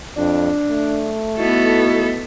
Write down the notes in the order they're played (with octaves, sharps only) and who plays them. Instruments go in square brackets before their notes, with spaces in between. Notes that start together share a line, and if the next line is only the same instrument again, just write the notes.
[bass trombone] F2 [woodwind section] D4
[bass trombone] A3
[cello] B3 A4 [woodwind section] D#4 E4 F#4